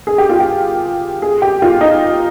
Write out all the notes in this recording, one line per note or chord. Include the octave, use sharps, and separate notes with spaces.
G#4
G4
F4
G4
G#4
G4
F4
D#4